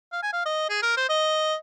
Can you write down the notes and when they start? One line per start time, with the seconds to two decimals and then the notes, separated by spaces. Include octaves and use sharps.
0.12 F5
0.23 G#5
0.33 F5
0.46 D#5
0.70 G#4
0.82 A#4
0.97 C5
1.09 D#5